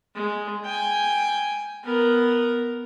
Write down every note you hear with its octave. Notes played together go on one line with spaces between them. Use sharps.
G#3
G5 G#5
B3 A#4